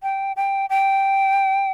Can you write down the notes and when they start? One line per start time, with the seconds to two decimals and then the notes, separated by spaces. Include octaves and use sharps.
0.03 G5
0.36 G5
0.70 G5